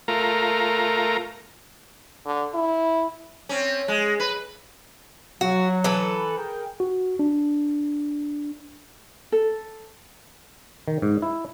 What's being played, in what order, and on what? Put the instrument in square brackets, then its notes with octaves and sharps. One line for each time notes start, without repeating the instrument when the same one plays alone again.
[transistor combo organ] A3 F4 A#4 A#5
[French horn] D3
E4
[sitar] C4 C#4
G#3
B4
[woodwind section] F#3 [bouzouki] F#4
[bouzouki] E3 A4 B4
[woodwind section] G#4 A#4 G5
[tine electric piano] F#4
D4
[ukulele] A4
[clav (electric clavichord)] D#3
G#2
E4